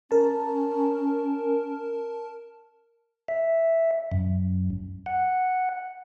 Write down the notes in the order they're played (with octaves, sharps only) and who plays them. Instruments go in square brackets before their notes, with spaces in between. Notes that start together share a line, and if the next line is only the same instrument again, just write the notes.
[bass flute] C#4 [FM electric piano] A#4 A5
[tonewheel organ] E5
F#2
F#5